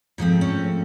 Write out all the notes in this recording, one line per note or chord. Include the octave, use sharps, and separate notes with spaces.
G#2 F3 A3 C4
C#4 C#5